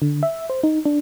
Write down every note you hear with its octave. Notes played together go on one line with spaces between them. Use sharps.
D3
E5
C5
D#4
D4